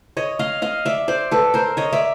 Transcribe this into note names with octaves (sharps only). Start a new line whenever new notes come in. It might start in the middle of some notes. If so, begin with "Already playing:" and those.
C#5 D#5
D#5 F5
D#5 F5
D5 E5
C5 D5
A4 B4
A#4 C5
C#5 D#5
D5 E5